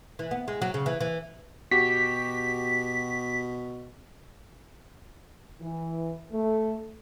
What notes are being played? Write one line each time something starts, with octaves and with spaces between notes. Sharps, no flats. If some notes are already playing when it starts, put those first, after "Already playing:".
E3
B3
G#3
F#3
C#3
E3
E3
B2 F#4 G4 B6
E3
A3